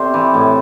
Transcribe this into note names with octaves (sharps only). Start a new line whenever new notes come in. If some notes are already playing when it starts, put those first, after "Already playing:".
Already playing: C3 A4 C5 D5
E3
A2